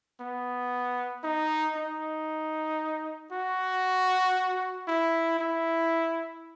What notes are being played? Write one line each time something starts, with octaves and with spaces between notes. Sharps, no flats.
B3
D#4
D#4
F#4
E4
E4